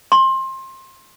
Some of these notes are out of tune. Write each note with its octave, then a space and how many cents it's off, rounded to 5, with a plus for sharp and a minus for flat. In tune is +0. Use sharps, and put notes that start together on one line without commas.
C6 +25